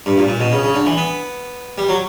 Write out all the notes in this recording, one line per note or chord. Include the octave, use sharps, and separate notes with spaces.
G2
A#2
A#2
B2
C#3
C#3
D3
E3
B3
G3
F#3